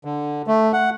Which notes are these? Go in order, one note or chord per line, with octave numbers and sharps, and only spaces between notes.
D3
A3
F#5